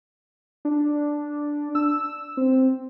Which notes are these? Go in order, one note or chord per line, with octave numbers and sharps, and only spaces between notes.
D4
E6
C4